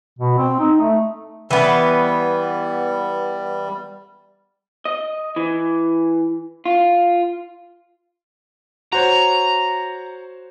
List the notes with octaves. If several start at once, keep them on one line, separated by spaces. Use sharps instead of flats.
B2
C4
D#4
A3
E3 G3 B3
D#5
E3
F4
F#4 C5 C#5 A#5